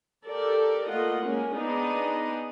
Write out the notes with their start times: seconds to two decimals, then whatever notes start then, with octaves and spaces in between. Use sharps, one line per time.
0.25 G4 A4 A#4 D5
0.88 A3 A#3 F4 D#5 F#5
1.24 G#3 A#3 C#4 A#4
1.55 B3 D4 D#4 G#4 D5 D#5